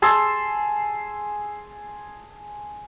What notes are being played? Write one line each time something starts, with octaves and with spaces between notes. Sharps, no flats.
G#4 A5 C6 E6